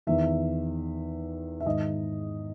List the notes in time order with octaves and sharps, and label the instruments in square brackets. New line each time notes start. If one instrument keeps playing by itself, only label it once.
[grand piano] E2 D#3 E5
E5
G#2 D#3 D#5